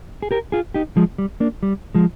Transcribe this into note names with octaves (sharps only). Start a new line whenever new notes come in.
G#4
G4 A#4
F4 G#4
D#4 G4
F3 G#3
G3
A#3 D4
G3
F3 G#3